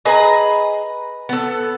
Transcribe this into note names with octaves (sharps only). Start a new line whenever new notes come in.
G#4 B4 D#5 G#5 A#5
B3 A4